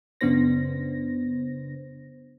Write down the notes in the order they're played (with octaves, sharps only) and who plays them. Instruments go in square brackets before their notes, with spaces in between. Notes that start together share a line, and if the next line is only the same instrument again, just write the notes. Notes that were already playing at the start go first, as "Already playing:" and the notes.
[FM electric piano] F#2 C#3 B3 D4 C5 A#6